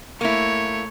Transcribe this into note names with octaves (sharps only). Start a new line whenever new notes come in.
A3 A#3 E4 C#5